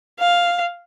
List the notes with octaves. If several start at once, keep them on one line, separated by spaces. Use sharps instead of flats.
F5